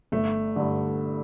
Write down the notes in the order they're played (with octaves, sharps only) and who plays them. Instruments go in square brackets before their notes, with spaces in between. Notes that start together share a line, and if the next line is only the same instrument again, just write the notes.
[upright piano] G1 [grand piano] A3
[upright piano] G2 D3